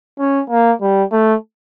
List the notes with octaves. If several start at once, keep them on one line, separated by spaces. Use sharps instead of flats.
C#4
A#3
G3
A3